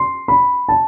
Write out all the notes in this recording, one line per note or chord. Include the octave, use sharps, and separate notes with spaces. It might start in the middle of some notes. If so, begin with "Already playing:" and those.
Already playing: C6
B5
A5